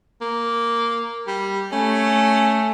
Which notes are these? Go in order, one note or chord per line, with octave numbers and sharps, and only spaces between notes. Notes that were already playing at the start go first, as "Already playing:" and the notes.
A#3
G3
A3 C#4